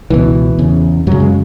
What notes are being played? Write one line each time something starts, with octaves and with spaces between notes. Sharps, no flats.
C#2 B2 E3
E2 C#3
F#2 C#3 F#3
G#3